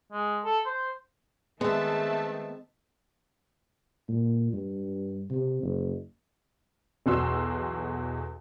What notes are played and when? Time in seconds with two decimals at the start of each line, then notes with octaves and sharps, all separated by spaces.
0.12 G#3
0.45 A4
0.66 C5
1.61 D#3 G#3 A3 B3 C4 E5 A5
4.09 A#2
4.53 G2
5.30 C3
5.63 F#1
7.06 B1 E2 F#4 C6 E6